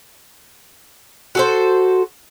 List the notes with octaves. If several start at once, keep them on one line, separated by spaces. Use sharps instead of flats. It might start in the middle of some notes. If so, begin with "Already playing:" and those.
F#4 A4 C5